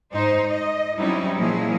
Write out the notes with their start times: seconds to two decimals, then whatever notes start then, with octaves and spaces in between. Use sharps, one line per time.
0.12 G#2 D#4 C5
0.50 D#5
0.98 F#3 G3 C4 C#4 D#4 E4
1.38 A#2 F3 F#3 A#3 E4 G#4